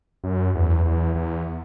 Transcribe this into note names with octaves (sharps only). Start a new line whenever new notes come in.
F#2
E2
E2
E2